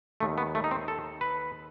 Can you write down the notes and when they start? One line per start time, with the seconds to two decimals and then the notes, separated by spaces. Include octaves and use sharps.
0.20 D#2 D#3 A3
0.38 B3
0.55 A3
0.64 D#4
0.71 C4
0.88 A4
1.21 B4